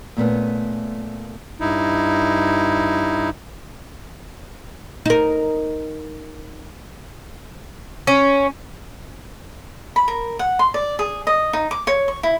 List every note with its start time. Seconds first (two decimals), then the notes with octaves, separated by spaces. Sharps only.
0.17 A#2 A3 B3 C#4
1.60 G2 D#4 E4
5.06 D#4 A#4
8.07 C#4
9.96 B5
10.08 A#4
10.39 F#5
10.59 C6
10.74 D5
10.99 G#4
11.27 D#5
11.53 D#4
11.71 D6
11.87 C#5
12.08 C#6
12.23 E4